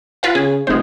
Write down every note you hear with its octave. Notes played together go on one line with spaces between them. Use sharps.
F4 B4 F5
C#3 G#4
F1 G#3 C5